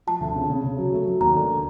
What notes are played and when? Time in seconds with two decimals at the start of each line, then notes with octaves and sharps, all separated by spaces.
0.07 F3 A5
0.21 D2
0.35 C#3
0.50 C#3
0.64 C#3
0.78 F#3
0.93 A3
1.06 F#3
1.20 D#2 A#5
1.35 D3